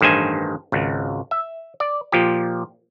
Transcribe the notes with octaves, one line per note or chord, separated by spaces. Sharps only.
A1 G2 D#3 C5 G#5
G#1 C#2
E5
D5
A#2 F3 G4